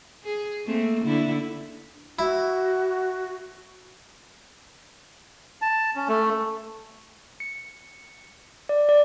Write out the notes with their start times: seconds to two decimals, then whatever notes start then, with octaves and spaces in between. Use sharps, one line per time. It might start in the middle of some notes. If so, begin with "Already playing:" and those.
0.24 G#4
0.66 A3 A#3 C4
1.04 D3 E4
2.19 E4 F#4
5.62 A5
5.96 C#4
6.08 A3
7.40 C#7
8.69 D5
8.89 D5